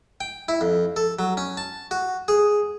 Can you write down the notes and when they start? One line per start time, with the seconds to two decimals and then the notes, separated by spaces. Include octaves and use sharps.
0.21 G5
0.48 E4
0.61 F2
0.96 A4
1.19 F#3
1.37 C#4
1.57 A5
1.91 F#4
2.28 G#4